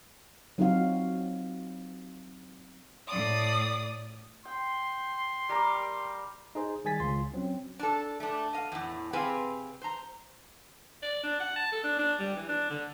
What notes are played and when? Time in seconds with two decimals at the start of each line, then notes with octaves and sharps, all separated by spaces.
0.58 F#3 C4 D#4 F4 F#4 F5
3.08 A2 D5 D#6
4.45 G5 C6
5.49 G3 A#4 D6
6.55 D#4 G#4 C5
6.85 D#3 G3 G#4 G#5 A6 B6
7.00 C#2 F4 C6
7.33 F#3 C4 C#4
7.79 D4 A4
8.20 A3 D4
8.53 D#5 F5
8.72 E2 A2
9.13 C3 C4 G#4 B4 F5
9.82 C5 A#5
11.03 D5
11.23 D4
11.40 F#5
11.56 A5
11.72 A4
11.84 D4
11.99 D4
12.20 G3
12.36 E3
12.49 D4
12.70 D3